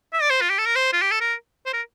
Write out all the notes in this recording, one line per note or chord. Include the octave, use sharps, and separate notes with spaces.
E5
D5
C5
F4
G4
A4
A#4
C5
F4
G4
A4
A#4
C5
A#4